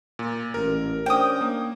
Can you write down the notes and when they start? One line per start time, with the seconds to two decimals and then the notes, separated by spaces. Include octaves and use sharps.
0.19 A#2
0.54 A1 A#4
1.06 C#4 D4 C5 G5 D#6
1.41 A#3